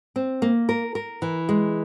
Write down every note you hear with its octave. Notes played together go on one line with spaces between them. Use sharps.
C4
A#3
A#4
A#4
E3
G#3